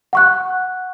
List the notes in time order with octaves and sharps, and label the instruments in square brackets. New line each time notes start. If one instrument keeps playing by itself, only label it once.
[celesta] F#5 C#6 F#6